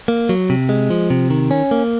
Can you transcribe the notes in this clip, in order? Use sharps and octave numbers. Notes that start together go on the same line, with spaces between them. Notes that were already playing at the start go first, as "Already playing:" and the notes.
A#3
F#3
C3
G#3
F3
C3
D#3
C#4
A#3